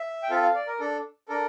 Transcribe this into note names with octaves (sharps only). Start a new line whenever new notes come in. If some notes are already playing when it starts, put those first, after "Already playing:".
Already playing: E5
G5
C4 F4 A4 F5
F5
D5
A#4
D4 A4
D4 A4 A#4